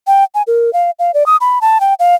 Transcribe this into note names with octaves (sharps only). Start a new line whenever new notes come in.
G5
G#5
A#4
F5
F5
D5
D#6
B5
A5
G5
F5